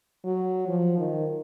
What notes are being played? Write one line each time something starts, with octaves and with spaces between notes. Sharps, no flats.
F#3
F3
D#3